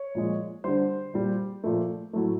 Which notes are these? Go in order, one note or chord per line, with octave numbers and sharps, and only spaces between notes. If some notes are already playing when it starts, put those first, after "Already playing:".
Already playing: C#5
A#2 F3 G#3
D3 G3 C5
A#2 G3
A#2 F3 A3
A2 F#3 A3